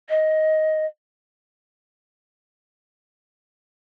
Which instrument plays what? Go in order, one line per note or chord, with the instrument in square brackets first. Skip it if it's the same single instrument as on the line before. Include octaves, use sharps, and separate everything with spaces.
[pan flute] D#5